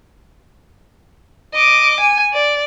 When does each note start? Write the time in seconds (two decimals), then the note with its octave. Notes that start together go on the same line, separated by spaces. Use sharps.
1.54 D#5 D6
2.00 G#5
2.33 D5